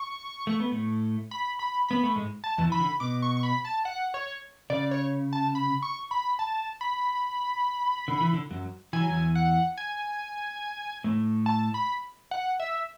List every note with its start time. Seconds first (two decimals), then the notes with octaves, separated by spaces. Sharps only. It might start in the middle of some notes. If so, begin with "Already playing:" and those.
Already playing: C#6
0.47 A3
0.60 B3
0.72 A2 A3
1.31 B5
1.59 B5
1.88 B3 B5
2.03 A3
2.16 G#2 G#3
2.44 A5
2.58 E2 E3
2.70 E3 B5
2.80 D3
3.00 B2 D6
3.22 C#6
3.37 C#6
3.43 B5
3.65 A5
3.85 F#5
4.14 C#5
4.70 C#3 D5
4.91 C#5
5.33 A5
5.55 B5
5.83 C#6
6.11 B5
6.39 A5
6.81 B5
8.08 D3
8.21 E3
8.33 D3
8.51 F#2 F#3
8.93 E3 G#5
9.01 F#3
9.09 E2 E3
9.35 F#5
9.77 G#5
11.04 A2 A3
11.46 A5
11.74 B5
12.31 F#5
12.60 E5